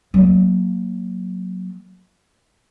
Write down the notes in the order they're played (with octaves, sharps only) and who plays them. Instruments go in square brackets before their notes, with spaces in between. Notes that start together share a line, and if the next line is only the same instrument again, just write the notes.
[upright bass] F#3 A#3